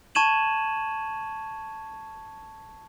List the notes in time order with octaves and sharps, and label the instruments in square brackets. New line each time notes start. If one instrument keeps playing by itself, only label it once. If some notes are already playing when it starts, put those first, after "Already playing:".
[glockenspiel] A5 C#6 G#6 D#7 E7 F#7